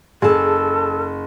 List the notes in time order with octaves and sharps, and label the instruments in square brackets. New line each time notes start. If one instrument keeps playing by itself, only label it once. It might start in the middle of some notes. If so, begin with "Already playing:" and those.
[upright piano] F#1 [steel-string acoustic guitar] G#4 A5 [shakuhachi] A4